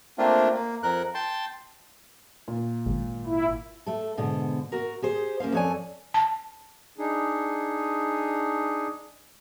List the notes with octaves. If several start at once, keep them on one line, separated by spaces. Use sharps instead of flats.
A3 A#3 C4 D4 F4
A#3
F2 A#4 F#6
G5 A5 C6
A#2
G#1
E4
A3 A4
G#2 B2 D3
F#4 A#4
G4 G#4 C5
A#3 C#4 C5 F5
F2 A4 C#5 D5 G#5
A5
D4 D#4 G#4